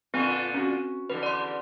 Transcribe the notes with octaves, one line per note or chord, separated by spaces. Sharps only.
A#2 D3 C4 F4 B4 G#5
C#4 F#4
E2 G#2 D3 B4
D5 C6